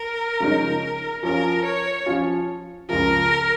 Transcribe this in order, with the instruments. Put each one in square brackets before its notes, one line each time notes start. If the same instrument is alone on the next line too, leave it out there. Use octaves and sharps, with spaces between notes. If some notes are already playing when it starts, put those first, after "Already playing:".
Already playing: [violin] A#4
[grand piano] C#3 F3 G#3 D#4 C#5
[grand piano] F3 C#4 F4 [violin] A#4
[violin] C#5
[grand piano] F3 C#4 F4
[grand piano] C#2 C#3 F3 [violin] A#4